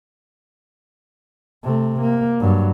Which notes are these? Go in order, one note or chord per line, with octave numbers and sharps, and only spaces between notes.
C3 A3
A#3
G2 F#3